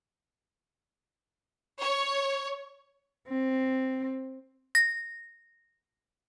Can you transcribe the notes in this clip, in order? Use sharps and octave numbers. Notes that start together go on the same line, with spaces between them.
C#5
C4
A#6